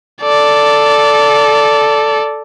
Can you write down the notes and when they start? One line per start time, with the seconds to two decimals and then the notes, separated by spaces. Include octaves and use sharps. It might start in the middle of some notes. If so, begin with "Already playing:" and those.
0.22 A4 D5